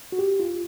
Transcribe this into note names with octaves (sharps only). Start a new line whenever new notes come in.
F#4
G4
F4